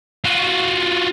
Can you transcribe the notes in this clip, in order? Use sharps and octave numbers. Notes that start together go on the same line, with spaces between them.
F4 F#4